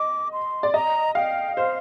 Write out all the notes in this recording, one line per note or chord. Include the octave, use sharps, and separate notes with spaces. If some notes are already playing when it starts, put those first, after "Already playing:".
Already playing: D#5 D6
C6
D5
D#5 A#5
F5 G5
C5 F5